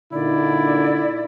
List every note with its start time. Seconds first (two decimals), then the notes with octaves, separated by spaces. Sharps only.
0.13 A#2 D3 D#4 E4 D5